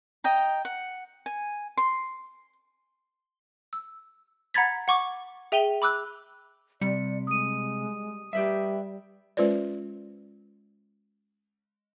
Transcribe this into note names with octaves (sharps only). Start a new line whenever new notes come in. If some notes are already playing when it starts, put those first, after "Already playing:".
D#5 G5 A#5
F#5
G#5
C6
E6
F#5 A#5 B5 G#6 A6 B6
F#5 C#6 D6
G#4 E5 G5 D#7 F7 G7
B5 D6 E6 F#6
C3 G3 D5 C#7
G#3 D#6 D#7
G3 G4 B4 E5
G#3 C#4 F4 B4 C5 D5